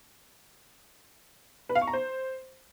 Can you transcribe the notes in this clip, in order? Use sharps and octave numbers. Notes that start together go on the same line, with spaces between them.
B4
F5
C#6
A#5
C5